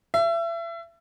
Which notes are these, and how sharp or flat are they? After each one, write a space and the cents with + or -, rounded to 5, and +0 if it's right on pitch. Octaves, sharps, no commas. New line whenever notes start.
E5 +30